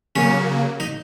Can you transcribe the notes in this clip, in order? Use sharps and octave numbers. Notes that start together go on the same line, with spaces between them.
C#3 F#3 A#3 C#4
D#4